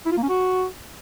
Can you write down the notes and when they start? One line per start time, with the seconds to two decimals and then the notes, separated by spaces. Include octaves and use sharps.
0.06 E4
0.12 F4
0.17 A#3
0.23 C#4
0.29 F#4